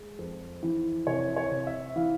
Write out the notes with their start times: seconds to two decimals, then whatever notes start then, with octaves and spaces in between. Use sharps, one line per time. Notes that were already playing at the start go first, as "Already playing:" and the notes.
Already playing: G#3
0.19 F2
0.63 E3
1.07 C3 C#5
1.36 C#5
1.51 C3
1.67 E5
1.96 E3 F5